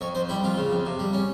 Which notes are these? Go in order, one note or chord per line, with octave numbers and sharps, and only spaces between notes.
F2 C#5
F2 C5
G3 E4
F2 F4
C#3
F2
C3
G3
C#4